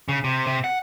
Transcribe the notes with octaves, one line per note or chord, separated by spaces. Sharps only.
C#3
C3
C3
F#5